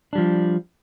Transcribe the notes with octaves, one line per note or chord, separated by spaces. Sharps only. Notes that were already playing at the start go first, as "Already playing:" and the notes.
F3 G3 D4